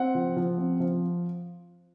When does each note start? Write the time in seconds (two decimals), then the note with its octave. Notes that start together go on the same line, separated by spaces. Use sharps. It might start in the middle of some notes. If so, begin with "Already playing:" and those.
Already playing: C4 F#5
0.15 F3
0.36 F3
0.58 C4
0.80 F3